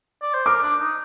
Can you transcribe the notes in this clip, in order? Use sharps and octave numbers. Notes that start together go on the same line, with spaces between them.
D5
C5
A#4 D6
D4
D#4